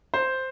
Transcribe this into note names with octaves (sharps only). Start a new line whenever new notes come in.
C5